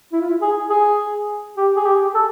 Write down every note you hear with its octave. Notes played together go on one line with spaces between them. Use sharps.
E4
F4
E4
G#4
G#4
G4
G#4
G4
A4